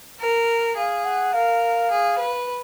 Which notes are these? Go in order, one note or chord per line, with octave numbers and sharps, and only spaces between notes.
A#4
G#4 F5
F#5
A#4 F5
G#4
B4